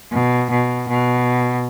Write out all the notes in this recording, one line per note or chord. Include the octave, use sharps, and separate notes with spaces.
B2
B2
B2